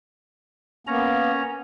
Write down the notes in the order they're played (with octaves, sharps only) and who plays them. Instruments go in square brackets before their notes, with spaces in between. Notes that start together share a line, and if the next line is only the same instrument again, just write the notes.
[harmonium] A#3 B3 [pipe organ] C#4 A#5